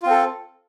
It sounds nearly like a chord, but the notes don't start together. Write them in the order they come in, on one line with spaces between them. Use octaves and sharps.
F4 C4 A4